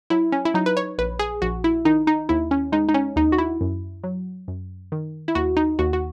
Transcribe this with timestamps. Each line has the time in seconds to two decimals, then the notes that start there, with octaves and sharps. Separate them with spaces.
0.10 F#3 E4
0.32 C#4
0.45 E4
0.54 F#3 D#4
0.66 B4
0.77 C#5
0.98 A#1 B4
1.19 G#4
1.42 A#1 F#4
1.64 E4
1.85 D#3 D#4
2.07 D#4
2.29 D#2 E4
2.51 C#4
2.72 G#3 D#4
2.89 D#4
2.94 C#4
3.16 D#2 D#4
3.32 F#4
3.38 E4
3.61 F#2
4.04 F#3
4.48 F#2
4.92 D#3
5.28 E4
5.35 D#2 F#4
5.57 D#4
5.79 D#2 F#4
5.93 F#4